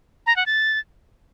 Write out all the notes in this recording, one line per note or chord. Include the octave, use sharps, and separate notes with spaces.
A#5
F#5
A6